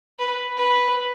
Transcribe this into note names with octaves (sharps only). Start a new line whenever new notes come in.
B4
B4